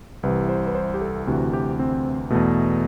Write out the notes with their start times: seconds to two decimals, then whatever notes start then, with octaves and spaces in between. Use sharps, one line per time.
0.23 C2 C3 E3 B4
0.49 C5
0.67 B4
0.75 C5
0.94 G4
1.01 A4
1.27 D2 C3 E3 F#4
1.53 G4
1.79 C4
2.30 E2 B2 A3